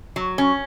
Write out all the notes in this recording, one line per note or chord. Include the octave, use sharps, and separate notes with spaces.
F#3
C#4